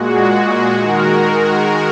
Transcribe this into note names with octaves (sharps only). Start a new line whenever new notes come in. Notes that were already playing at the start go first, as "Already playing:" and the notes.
Already playing: A#2 G#3 F#4
D#3 G#3 F#4 A#4